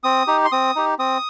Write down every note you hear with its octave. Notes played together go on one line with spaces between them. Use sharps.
C4 D#6
D#4 G4
C6
C4 D#6
D#4 G4
C4 D#6